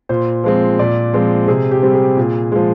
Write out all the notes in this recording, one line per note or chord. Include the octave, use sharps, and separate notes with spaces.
A#2 C5
F3 G#3 C4
A#2 D5
F3 G#3 C4
C3 G#4
G4
G3 C4
G#4
A#2
F3 G#3